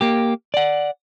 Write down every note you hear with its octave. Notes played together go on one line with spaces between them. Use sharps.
A#3 G4
D5 F#5